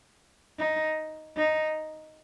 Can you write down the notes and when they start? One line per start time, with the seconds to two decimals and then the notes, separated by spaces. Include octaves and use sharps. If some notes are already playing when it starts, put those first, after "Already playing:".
0.59 D#4
1.36 D#4